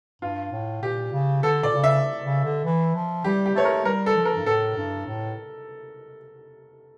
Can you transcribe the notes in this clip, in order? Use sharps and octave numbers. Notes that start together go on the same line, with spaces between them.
G2 F4
A2
A#2 G4
C#3
D3 A4
A#2 D5
C#3
E5
C#3
D3
E3
F3
G3 G4
G4
A3 C#5
A#4
G3 A#4
A4
F3
A#4
G2
A2 A4
G2
A2